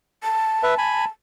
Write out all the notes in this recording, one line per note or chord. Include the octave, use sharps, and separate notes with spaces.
A5
B4 E5
G#5 B5